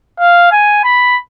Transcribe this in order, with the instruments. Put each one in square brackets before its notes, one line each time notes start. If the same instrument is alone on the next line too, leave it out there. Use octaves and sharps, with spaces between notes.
[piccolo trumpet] F5
G#5
B5